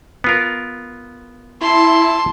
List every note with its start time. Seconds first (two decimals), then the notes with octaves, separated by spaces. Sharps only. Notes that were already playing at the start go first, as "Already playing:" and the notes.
0.24 B3 F4 A#4
1.61 E4 A5 C6